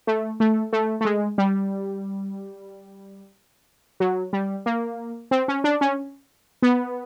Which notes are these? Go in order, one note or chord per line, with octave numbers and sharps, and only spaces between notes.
A3
A3
A3
A3
G#3
G3
F#3
G3
A#3
C4
C#4
D4
C#4
B3